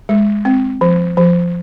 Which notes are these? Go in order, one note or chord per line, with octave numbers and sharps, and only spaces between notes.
G#3
C4
F3
F3